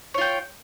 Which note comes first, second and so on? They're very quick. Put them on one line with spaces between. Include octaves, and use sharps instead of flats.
C#5 F4 G5